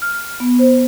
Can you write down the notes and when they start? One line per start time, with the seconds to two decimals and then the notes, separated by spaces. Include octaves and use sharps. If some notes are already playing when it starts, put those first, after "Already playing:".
0.02 F6
0.40 B3
0.59 C5